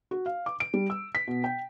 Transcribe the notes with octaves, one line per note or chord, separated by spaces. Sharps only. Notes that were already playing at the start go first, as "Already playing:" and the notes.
F#4
F5
D6
D7
G3
E6
B6
B2
G5